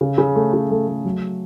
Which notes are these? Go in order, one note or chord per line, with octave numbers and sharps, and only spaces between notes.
C#3
C#3
A3
C#3
A3
A3
F#3